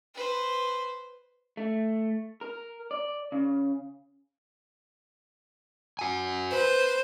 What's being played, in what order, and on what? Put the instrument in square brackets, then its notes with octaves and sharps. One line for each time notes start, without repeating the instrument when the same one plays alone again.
[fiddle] B4 C5
[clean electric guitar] A3
A#4
D5
C#3
[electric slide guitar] F#4 G#5
[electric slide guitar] B4 [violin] C5